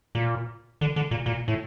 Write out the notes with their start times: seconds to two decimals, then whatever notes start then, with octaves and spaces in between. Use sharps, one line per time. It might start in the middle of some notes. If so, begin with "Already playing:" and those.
0.15 A#2
0.81 D3
0.96 D3
1.11 A#2
1.26 A#2
1.48 A2